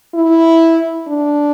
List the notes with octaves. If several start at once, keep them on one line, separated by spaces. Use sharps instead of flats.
E4
D4